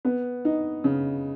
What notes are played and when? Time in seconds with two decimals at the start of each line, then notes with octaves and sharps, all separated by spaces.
0.05 B3
0.45 D#4
0.84 C#3